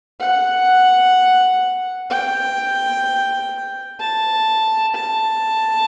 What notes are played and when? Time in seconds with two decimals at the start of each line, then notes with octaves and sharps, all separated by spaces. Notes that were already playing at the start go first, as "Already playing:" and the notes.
0.20 F#5
2.10 G5
4.00 A5
4.95 A5